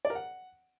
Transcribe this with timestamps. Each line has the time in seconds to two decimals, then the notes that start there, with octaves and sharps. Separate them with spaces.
0.05 D5
0.10 A#4
0.15 F#5